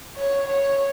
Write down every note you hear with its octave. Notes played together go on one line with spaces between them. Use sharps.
C#5
C#5